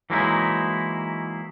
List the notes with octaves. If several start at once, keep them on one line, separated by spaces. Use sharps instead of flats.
E3 F#3 G#3 A#3 D#4 E4